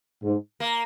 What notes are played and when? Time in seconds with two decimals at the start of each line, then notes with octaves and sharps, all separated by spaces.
0.23 G#2
0.60 A#3